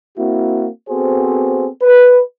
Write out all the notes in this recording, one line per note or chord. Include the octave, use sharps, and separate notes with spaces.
A#3 C4 E4 F#4
B3 C4 F#4 G#4 A4 C5
B4